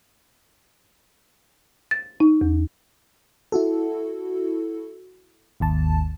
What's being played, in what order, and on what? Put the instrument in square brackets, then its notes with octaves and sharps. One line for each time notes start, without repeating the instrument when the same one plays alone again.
[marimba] A6
D#4
E2
[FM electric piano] E4 F#4 A4
G#1 D#2 A5